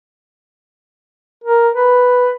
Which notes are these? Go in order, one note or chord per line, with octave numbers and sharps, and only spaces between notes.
A#4
B4